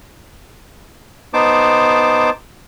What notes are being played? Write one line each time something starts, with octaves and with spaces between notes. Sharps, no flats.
B3 D#4 C5 A5 D6